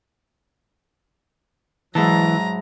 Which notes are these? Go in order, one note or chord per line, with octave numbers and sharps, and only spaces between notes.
G#2 E3 F#3 E4 A5 A#5